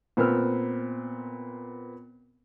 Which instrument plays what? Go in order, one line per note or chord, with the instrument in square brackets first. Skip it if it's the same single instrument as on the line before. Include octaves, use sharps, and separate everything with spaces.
[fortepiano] A#2 B3 C4 E6 F6